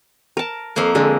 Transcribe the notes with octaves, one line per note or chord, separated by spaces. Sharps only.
A#4 A5
F2 A#3
D3 G#3